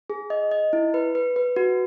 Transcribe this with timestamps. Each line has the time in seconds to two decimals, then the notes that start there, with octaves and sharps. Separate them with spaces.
0.10 G#4
0.30 D#5
0.51 D#5
0.73 E4
0.94 B4
1.15 B4
1.36 B4
1.56 F#4